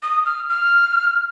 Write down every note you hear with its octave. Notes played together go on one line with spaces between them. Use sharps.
D#6
F6
F6